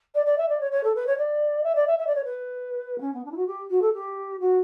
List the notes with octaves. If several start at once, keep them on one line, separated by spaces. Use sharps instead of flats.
D5
D5
E5
D5
C#5
C#5
A4
B4
C#5
D5
E5
D5
E5
E5
D5
C#5
B4
B3
C#4
B3
D4
E4
F#4
G4
F#4
A4
G4
F#4